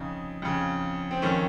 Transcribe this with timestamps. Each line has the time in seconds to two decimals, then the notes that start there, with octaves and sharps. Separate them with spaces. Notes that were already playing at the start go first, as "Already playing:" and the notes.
Already playing: F2 C#3 D#4
0.42 F2 C#3
1.11 C4
1.22 F2 D#3 C#4